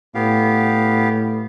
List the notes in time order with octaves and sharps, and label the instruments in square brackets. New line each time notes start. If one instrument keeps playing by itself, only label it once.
[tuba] A2 [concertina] B3 G4 F5